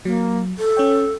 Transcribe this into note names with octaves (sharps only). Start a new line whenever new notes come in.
F#3 A#3
A4
C#4 C#5 G5